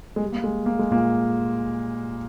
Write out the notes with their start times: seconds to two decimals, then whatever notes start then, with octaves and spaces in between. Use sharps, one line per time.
0.16 G#3
0.22 G3
0.32 A#3
0.44 G#3
0.66 A#3
0.79 G#3
0.91 A#2 A#3